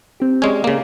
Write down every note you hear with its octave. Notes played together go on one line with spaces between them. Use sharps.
C4 G4
G#3 C#4 G4 D5 G#6
C#3 A#3